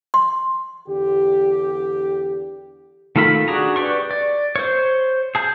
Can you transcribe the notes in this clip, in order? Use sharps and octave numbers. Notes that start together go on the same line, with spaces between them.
C6
E2 D3 G4
D#3 A3 F4 A4 B5
D4 F#4 G#4 A#5
G4 B4 D5 C#6
D5
C5 C#5
G#4 A5 G6